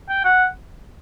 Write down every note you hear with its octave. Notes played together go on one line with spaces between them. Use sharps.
G5
F#5